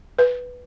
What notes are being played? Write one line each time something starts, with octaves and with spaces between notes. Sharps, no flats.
B4